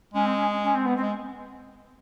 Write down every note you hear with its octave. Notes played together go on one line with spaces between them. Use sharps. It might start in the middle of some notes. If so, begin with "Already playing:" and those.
G#3 C#4
C4
C#4
C#4
C4
B3
C4
G#3